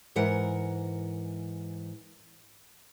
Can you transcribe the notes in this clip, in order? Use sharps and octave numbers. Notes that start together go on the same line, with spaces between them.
G#2 E3 A#4 F#5